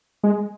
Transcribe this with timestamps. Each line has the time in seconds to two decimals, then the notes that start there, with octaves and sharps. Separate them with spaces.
0.24 G#3